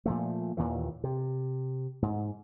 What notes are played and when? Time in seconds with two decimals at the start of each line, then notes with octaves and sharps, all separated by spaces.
0.06 A#2 F3 A3
0.57 D#2 A#2 D#3 E3
1.04 C3
2.02 G#2